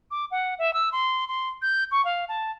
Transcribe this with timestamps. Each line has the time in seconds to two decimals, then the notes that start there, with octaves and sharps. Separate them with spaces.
0.11 D6
0.31 F#5
0.59 E5
0.74 E6
0.92 C6
1.28 C6
1.62 G6
1.91 C#6
2.05 F5
2.29 A5